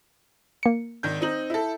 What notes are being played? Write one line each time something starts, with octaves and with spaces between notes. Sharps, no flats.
A#3 C#7
G#1 D#3 G6
C4 D#4 F#7
E4 A4